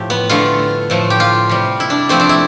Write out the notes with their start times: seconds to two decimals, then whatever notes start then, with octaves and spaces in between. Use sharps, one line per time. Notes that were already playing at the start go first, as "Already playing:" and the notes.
Already playing: A2 F3 A3 G4
0.10 B3
0.29 D3 A3 F4
0.90 A2 F3 A3
1.10 G4
1.20 F4
1.49 C3 G3
1.80 E4
1.90 D4
2.09 C3 F3 A3 C4
2.20 D4
2.29 E4